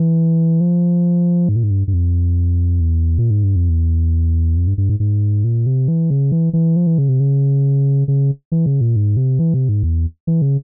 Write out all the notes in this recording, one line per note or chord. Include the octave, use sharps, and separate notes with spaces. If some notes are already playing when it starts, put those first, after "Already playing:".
Already playing: E3
F3
G#2
A#2
G#2
G2
G2
F2
E2
A#2
G#2
G2
F2
E2
F2
G2
G2
G#2
G#2
A#2
C3
E3
C#3
E3
E3
F3
E3
C#3
C3
C#3
C#3
E3
C#3
A#2
G#2
C3
E3
C3
G#2
E2
E3
C#3